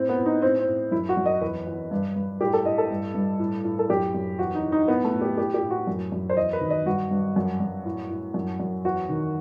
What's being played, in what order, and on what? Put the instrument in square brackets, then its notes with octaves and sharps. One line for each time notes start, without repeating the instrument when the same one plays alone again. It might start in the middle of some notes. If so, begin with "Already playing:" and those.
Already playing: [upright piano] A2 C4
B3
A2
D#4
A2 C4
C4
A2
F#2 E4
F#4
F#2
D#5
E2 B4
E2
G2
G2
A2 G4
A4
A2 D#5
A4
G2
G2
A2
A2
A4
F#2 G4
F#2
E2 F#4
D#4
E3
D#4
A2 B3
A3
A2
G4
A2 G4
G4
A2
F#4
F#2
F#2
C5
E2 D#5
B4
D#3
D#5
G2 F#4
G2
F#2
F#2
A2
A2
F#2
F#2
E2 F#4
D#3